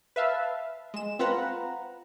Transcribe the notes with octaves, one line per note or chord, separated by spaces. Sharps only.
B4 E5 F5 A5
G#3 E7
C4 F4 B4 F#5 A#5